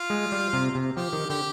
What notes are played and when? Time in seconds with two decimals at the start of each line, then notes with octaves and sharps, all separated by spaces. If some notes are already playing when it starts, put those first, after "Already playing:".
Already playing: F4
0.10 G#3
0.32 G3
0.53 C3
0.75 C3
0.97 F3 G4
1.13 D#3
1.29 D3 G4